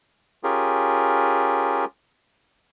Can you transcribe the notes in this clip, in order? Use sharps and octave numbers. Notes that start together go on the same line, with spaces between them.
C#4 F4 G4 G#4 A#4